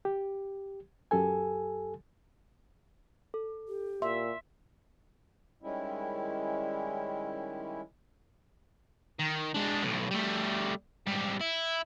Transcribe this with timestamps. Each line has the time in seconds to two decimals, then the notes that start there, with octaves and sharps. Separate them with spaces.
0.05 G4
1.11 F#2 G4 A4 G#5
3.34 A4
3.68 G4
4.02 A#2 E5 C6
5.62 D#3 G3 G#3 C#4 E4
9.19 D#3
9.54 G#3 D4
9.83 B1 A2
10.11 G3 A3
11.07 G#2 G3
11.40 E4